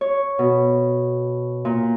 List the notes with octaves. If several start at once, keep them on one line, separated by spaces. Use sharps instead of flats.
C#5
B2
A#2